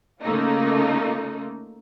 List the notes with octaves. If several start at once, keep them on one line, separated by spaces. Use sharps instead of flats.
C#3 A3 A#3 D#4 F4